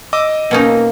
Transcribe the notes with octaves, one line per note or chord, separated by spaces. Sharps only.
D#5 D6 E6
B2 A#3 C#4 D#4